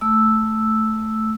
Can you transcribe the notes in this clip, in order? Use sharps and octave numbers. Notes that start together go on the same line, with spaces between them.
A3 E6